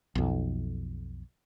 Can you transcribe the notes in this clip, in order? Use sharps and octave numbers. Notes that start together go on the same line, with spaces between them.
B1 F2